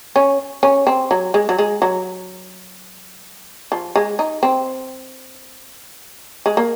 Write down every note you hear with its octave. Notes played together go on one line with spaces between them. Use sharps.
C#4
C#4
C4
F#3
G#3
F#3
G#3
F#3
F3
G#3
D#4
C4
G#3
A#3